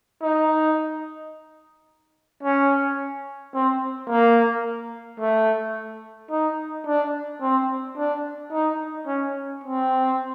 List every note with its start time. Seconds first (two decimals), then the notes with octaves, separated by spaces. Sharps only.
0.22 D#4
2.43 C#4
3.54 C4
4.09 A#3
5.20 A3
6.31 D#4
6.87 D4
7.42 C4
7.97 D4
8.52 D#4
9.07 C#4
9.63 C4